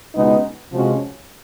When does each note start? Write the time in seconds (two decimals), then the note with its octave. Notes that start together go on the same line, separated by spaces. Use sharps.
0.15 C#2 B2 G#3 B3 D#4
0.72 C3 F3 G#3 C#4 F#4